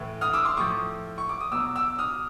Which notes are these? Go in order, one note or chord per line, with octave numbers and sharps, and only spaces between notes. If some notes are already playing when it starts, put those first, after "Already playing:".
Already playing: A2 E3
D#6 F6
D6 E6
C6 D6
A2 F3 C#6 D#6
C#6
D6
D#6
B2 F#3 D6 E6
D6 E6
D#6 F6